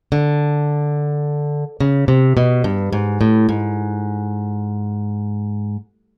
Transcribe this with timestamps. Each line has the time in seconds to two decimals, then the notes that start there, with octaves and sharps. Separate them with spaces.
0.12 D3
1.81 C#3
2.08 C3
2.37 B2
2.64 G2
2.93 G#2
3.21 A2
3.49 G#2